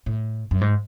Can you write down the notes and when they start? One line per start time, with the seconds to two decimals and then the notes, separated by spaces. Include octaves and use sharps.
0.06 A2
0.51 F#2
0.61 G#2